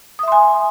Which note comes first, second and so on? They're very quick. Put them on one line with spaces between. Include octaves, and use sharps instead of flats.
D#6 E5 C6 G#5